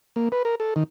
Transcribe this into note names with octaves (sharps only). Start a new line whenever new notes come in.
A#3
B4
A#4
A4
D#3